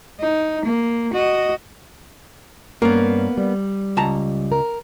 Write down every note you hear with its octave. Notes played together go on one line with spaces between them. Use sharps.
D#4
A#3
F#4 D#5
G2 A#3 B3 C#4 A#4
G3
C#2 A5 A#5
A#4